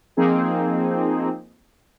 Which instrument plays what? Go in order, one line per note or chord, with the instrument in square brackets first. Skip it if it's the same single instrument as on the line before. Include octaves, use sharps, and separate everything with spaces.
[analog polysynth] F3 A#3 C4 D#4 G#4